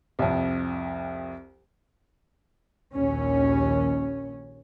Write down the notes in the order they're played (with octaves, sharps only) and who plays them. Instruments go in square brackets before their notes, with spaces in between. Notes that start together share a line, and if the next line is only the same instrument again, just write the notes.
[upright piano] C2 F2
[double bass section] A#1 D#2 C#4